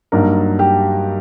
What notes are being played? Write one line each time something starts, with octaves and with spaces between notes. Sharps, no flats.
G2 F#3 A#3 D#4 A#4
G4